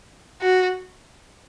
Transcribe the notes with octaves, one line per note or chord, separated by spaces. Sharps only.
F#4